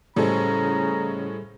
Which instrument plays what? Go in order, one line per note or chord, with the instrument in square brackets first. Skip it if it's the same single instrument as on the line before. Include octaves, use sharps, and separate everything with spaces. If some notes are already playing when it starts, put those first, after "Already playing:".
[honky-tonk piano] A2 G#3 G#4 [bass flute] C#3 [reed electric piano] G3 A4 C5 [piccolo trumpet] A#5